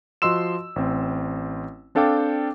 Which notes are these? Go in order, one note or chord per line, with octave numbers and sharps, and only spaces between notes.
F3 F#4 D#5 C6 E6 E7
A1 C4
C4 D4 A4 F5 G5 D6